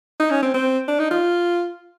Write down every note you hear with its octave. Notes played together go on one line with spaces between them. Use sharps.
D#4
C#4
C4
C4
D4
D#4
F4